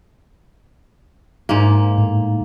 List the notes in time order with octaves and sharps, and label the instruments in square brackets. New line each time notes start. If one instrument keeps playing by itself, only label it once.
[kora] G#2 A#3
[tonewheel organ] A2